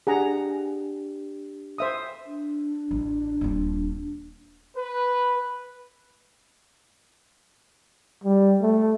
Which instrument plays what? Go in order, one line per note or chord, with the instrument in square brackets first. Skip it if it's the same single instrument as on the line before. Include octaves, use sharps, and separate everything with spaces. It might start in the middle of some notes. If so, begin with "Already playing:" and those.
[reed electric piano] D4 G4 [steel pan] G#4 F#5 A#5
[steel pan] C5 E5 D#6
[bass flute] D4
[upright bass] A1
D#1 C4
[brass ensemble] B4
[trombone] G3
A3